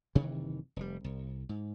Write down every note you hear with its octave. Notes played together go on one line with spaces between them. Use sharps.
F#1 C3 D#3 E3
F1 G3
C2
G#2